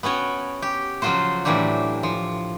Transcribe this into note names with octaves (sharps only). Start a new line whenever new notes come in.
B3 C#4 F#4 C#5 G5
G4
C#3 F3 F#3 F4 F#4 C5
A2 E3 F#3 D4 G4
F3